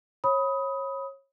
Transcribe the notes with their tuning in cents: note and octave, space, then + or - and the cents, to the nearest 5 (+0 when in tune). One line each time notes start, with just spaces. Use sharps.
C#5 -25 B5 +0 D#6 +20